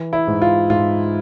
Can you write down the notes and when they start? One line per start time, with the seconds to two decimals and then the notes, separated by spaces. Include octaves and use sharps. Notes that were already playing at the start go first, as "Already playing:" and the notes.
Already playing: E3
0.13 E4
0.27 G#2
0.42 F4
0.70 G#2 F4